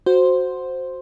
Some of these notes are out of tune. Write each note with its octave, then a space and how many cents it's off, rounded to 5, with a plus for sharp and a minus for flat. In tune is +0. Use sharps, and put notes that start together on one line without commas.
F#4 -5 C5 +0